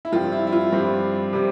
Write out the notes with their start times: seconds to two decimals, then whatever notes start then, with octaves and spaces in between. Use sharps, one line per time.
0.05 E4
0.12 G2 F3 C4 F4
0.32 E4
0.47 E4
0.52 F4
0.72 G2 F3 C4 G4
1.33 C3 G3 C4